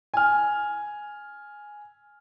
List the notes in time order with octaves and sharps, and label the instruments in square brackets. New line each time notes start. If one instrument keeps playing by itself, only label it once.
[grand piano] G#5 F6